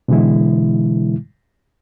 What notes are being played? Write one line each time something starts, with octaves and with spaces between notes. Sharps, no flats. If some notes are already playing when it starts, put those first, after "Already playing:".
B2 D3 E3 G#3 E4